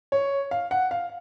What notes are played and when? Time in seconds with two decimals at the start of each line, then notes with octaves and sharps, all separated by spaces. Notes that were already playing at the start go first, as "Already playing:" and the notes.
0.12 C#5
0.51 F5
0.71 F#5
0.91 F5